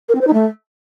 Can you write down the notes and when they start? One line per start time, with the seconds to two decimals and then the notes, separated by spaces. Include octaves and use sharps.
0.09 A#4
0.15 C4
0.21 C5
0.27 D#4
0.33 A3